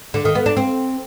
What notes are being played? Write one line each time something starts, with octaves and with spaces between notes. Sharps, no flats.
D3
D#3
B3
D4
C4